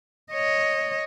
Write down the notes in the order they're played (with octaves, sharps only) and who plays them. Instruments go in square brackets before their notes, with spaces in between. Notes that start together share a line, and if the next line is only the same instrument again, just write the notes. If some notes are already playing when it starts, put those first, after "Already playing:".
[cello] C#5 D#5